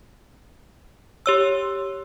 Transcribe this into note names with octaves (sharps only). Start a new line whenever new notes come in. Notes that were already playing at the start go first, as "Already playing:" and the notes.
G4 C#5 E6